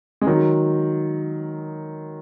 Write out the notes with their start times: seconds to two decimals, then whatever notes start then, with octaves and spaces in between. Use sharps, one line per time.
0.21 G#3
0.27 D#3 F#3